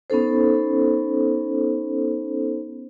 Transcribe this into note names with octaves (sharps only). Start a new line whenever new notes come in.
B3 C#4 D#4 A4 C5